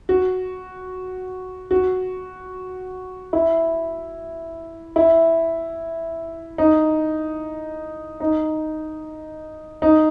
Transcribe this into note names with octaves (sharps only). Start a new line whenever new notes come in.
F#4
F#4
E4
E4
D#4
D#4
D#4